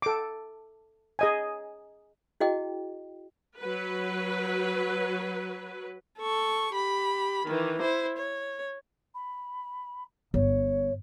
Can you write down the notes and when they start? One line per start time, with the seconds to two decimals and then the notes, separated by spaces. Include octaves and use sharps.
0.02 A4 D6
1.19 G#4 D#5 G#5
2.40 E4 F#4 G#4 D#5 G5
3.59 F#3 B4
6.19 A4 C#6
6.74 G4 B5
7.46 D#3 E3
7.81 E4 C5
8.17 C#5
9.14 B5
10.34 G1 C#5